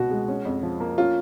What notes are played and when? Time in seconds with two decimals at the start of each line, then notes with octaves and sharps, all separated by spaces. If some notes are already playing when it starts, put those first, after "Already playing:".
Already playing: C#2 B2 C#4 F#4
0.11 G#3
0.28 C#4
0.45 F2
0.63 F3
0.80 A#3
0.98 C#4 F4